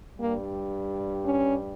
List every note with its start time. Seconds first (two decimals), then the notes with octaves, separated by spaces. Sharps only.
0.17 G2 G3 A#3
1.23 C#4